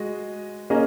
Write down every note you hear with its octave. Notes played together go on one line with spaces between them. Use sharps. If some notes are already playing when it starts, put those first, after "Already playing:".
Already playing: G#3 F#4 D#5
A#3 C#4 G#4 D#5